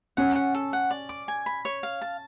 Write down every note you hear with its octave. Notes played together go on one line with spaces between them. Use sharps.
C#4 F#5
F#5
A4
F#5
D5
D6
G#5
B5
C#5
F5
A5